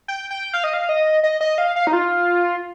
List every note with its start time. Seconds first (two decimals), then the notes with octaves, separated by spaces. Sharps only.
0.08 G5
0.31 G5
0.54 F5
0.64 D#5
0.74 F5
0.89 D#5
1.24 D#5
1.41 D#5
1.58 F5
1.76 F5
1.87 D#4
1.93 F4